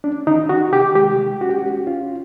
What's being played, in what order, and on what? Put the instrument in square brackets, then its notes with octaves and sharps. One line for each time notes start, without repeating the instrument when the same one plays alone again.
[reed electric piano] C#4 D4
D#3 D#4
D#3 F#4
C3 G4
G#3 G4
G#3
C#4 F#4
G4
F#4
C#4
C#4 F4